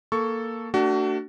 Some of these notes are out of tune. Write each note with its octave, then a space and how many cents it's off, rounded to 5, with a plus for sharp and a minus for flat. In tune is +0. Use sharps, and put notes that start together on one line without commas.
A#3 +0 A4 +0 C#6 +10
A3 +30 D4 +0 F#4 +30